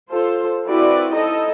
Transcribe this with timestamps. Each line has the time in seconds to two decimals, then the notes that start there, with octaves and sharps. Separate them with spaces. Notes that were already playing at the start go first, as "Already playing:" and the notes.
0.11 F4 A4 C5
0.66 C4 E4 F#4 B4 D5
1.14 D#4 E4 A4 D#5